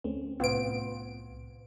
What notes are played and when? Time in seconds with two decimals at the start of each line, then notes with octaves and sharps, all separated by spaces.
0.04 D2 C4 C#4
0.40 C2 A2 B3 C4 F4 D7